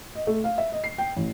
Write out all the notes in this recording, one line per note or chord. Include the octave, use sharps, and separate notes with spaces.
D#5
A3
F5
E5
D#5
C7
G5
A1